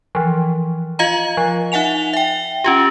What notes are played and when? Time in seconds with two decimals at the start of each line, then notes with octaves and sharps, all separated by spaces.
0.15 E3 F3
0.99 F4 D#5 F5 A#5
1.37 F3
1.72 D#4 E5 F#5 G#5 F7
2.13 E5 G5
2.64 C#4 F4 G4